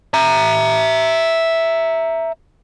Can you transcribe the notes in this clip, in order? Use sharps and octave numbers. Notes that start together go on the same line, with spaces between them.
E5 A#5